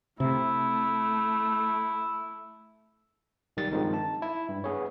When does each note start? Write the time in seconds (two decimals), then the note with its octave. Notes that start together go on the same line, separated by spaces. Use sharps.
0.20 C3 A3 E4
3.57 B1 D#3 G3 A6
3.71 G2 D#3 F3 G#3 C4 D#4
3.93 A5
4.22 E4
4.49 G2
4.64 B3 G#4 C#5